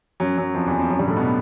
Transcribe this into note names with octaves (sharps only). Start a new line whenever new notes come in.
F#2 F#3
F#2 F#3
F2 F3
E2 E3
F2 F3
F#2 F#3
G2 G3
A2 A3
B2 B3